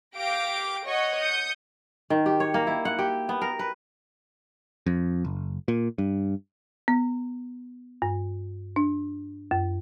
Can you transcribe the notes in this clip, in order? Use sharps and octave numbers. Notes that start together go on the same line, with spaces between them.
G4 F5 G5 D6 A#6 D7
C#5 D#5 F#5 C#6
D#6 G6 C#7
D#3
G4
C#5
A#3
E4
F#5
G4
B3
A#4
B4
F2
F#1
A#2
G2
B3
G2
D4
F#2